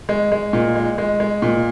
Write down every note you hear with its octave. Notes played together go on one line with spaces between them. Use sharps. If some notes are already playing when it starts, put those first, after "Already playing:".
G#3
G#3
A#2
G#3
G#3
G#3
A#2